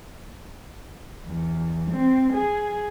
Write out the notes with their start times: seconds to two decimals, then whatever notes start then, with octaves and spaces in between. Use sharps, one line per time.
1.26 E2
1.92 C4
2.33 G#4